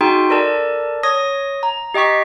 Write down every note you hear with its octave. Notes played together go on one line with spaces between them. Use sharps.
D#4 F#4 G#4 G5 C6
A4 A#4 D5 A5
C#5 D#6 A#6
A#5
G4 D#5 G5 C#6 B6